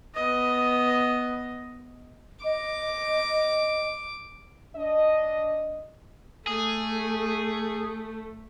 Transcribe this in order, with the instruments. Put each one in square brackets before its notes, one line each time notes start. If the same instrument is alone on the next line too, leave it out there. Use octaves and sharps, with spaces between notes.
[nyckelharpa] B3 D#5
[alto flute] D#5 [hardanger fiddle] D6
[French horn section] D4 D#5
[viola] A3 [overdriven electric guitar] G#4